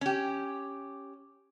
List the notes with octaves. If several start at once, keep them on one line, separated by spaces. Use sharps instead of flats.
C#4 G4